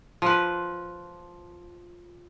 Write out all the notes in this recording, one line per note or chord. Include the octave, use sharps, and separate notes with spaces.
F3 B4